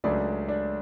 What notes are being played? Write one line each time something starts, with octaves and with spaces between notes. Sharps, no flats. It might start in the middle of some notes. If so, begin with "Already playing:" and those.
C#2 C#3 F#3 A3 D4 D5
D4 D5